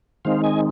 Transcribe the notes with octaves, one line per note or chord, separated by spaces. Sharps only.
D#3 G#3 C4 D#4 C5 F5
D#5 G#5